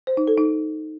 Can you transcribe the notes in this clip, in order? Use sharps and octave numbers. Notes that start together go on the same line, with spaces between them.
C5
D#4
A4
D#4